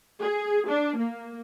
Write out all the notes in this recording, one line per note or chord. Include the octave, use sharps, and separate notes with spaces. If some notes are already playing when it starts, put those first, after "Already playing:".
G#4
D4
A#3